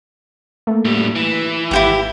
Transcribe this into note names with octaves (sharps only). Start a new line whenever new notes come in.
A3 A#3
A2 G3
E3
G#1 E4 G4 F#5 D6 E7